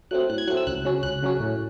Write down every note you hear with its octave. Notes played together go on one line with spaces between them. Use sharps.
F#3 A3 C4 F#6
A2 F#6
G#6
F#3 A3 C4 F#6
E6
C#2 F#6
C#3 F#3 C#4
C#2 F#6
C#3 F#3 C#4
A2